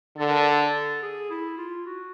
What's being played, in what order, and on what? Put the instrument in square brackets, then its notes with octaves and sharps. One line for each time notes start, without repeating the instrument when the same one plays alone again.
[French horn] D3 [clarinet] A4
[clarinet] A#4
A4
A4
G#4
E4
F4
F#4